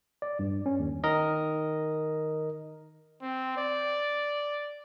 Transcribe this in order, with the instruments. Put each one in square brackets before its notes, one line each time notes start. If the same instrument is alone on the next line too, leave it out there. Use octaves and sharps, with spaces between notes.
[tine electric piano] D5
G2
C#4
D#2
D#3 A#4 D#5
[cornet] C4
D5